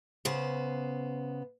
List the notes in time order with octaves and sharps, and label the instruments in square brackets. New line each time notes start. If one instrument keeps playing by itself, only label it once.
[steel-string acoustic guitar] C#3 B3 C5